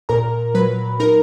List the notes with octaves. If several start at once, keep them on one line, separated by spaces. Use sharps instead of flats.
A#2 A#4 A#5
F#3 B4 B5
D#4 A#4 A#5